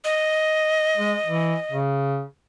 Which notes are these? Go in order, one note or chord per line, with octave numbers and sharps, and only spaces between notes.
D#5
G#3
E3
C#3